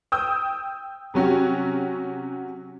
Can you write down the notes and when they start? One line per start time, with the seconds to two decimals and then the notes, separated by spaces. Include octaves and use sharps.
0.12 G5 D#6 E6 G6
1.14 C3 F#3 C#4 F#4 G4